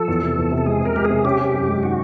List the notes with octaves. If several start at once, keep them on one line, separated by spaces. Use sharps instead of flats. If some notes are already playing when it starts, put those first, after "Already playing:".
Already playing: F3 A4
E2
C3
E2
C3
A4
G#3 G#4
C3 A#4
G#3 G4
G#4
C3
C#4 G4
C#4
F#2
G#3
D#3 F#4